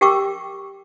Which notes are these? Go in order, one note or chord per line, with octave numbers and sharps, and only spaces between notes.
G4 A#4 G5 C#6 D6 E6